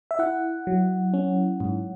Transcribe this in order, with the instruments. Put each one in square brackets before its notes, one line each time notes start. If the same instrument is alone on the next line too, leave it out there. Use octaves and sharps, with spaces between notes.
[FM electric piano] E5
E4 F#5
F#3
C#4
G#2